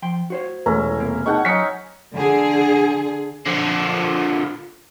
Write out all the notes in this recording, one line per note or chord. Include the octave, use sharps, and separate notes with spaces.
F3 G5 C6
F#4 C5 C#5
E1 A3 C#4 E4 A#5
C3 A#3
D#4 G#4 F#5 G5 A5 C#6
F#3 C#4 D#4 B6 C#7
D3 G#4
D3 F3